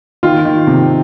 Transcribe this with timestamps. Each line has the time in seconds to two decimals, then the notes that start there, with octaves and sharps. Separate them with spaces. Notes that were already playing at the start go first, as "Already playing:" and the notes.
0.23 D#3 F4
0.45 D#3
0.67 C3